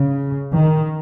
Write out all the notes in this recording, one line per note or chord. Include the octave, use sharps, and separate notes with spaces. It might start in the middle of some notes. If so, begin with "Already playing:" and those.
Already playing: C#3
D#3